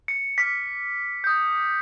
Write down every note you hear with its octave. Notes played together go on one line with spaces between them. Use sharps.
C#7
D6 F6 B6
D#6 G6